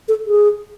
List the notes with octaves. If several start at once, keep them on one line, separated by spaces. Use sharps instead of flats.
A4
G#4